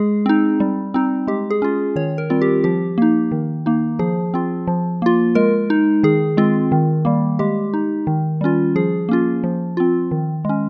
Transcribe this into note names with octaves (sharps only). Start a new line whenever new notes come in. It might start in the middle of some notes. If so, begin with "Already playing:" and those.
Already playing: G#3 G#4
C4 D#4
G3
C4 D#4
G#3 G4
G#4
C#4 F4
D#3 C#5
A#4
G3 C4 F4
G4
F3 G4
A#3 D#4
D#3
A#3 D#4
F3 G#4
C4 F4
F3
A#3 F4
G#3 A#4
D#4
D#3 G#4
G#3 C4 F4
D#3
G3 A#3
G#3 G4
D#4
D#3
G3 C#4 F4
F3 G#4
A#3 C#4 F4
F3
C4 F4
D#3
G#3 C#4